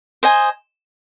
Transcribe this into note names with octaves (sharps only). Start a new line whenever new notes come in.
C5 D#5 G#5